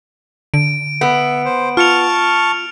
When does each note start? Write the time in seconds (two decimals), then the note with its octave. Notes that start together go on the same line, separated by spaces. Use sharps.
0.54 D3 D7
1.01 B3 E5
1.45 C5
1.77 F4 A5 C#6 F6 C#7 F7